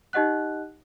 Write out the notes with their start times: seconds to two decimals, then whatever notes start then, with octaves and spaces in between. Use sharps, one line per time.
0.13 D#4 G4 D#5 F#5 F#6